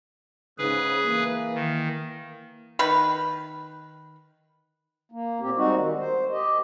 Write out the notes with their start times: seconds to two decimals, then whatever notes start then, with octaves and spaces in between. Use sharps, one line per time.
0.58 G#2 C#3 G#4 B4
1.05 E3 A#3
1.55 D#3
2.79 D#3 B4 B5
5.12 A#3
5.40 A#2 C4 G4
5.56 G3 G#3 C4 D#4 F#4
5.75 D#3
5.98 C5
6.31 G4 D#5